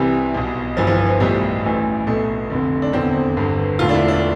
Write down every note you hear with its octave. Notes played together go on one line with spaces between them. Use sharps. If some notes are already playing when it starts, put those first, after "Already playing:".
Already playing: C2 C3 E3 G3
B1 B2
G1 G2 E3 F3
F3
E3
F3
B1 A2 E3 G3
A1 A2 E3
B1 B2 A3
F1 F2 D3
D4
F1 E2 D3 C4
G1 G2 D3
E1 D2 D3 F4
D4
E4
D4